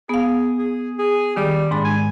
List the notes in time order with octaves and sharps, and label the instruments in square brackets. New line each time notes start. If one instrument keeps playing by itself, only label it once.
[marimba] B3 F5 [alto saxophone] G#4
[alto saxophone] G#4
G#4
[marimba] D#3 [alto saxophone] G3
[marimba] G#2 G#3 B5 [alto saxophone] D4
[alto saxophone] G#5